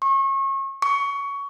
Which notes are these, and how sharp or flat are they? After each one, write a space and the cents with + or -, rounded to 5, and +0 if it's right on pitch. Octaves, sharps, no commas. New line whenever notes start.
C#6 -35
C#6 +20